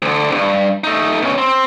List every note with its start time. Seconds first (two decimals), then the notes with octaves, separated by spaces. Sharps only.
0.02 D2 D3
0.30 C2 G2
0.84 A3 D#4
1.22 B2 C#4
1.38 C4